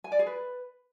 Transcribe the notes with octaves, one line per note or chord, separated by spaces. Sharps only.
G#5
D5
G#4
B4